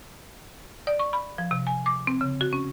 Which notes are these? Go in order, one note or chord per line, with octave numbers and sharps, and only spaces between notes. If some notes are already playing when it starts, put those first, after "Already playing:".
D5
C#6
B5
F3
C3
G#5
D6
C4
C#3
F#4
C#4